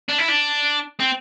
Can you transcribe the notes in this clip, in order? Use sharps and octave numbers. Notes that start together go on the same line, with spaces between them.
D4
E4
D4
C4